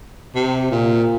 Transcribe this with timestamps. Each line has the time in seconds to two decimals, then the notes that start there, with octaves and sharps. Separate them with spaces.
0.35 C3
0.71 A#2